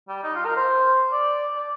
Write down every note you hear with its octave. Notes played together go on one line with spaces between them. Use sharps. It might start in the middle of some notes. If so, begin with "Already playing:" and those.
G3
D#4
F4
A#4
C5
D5
D5